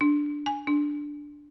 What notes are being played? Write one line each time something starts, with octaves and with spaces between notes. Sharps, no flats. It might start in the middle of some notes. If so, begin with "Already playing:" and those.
D4
G#5
D4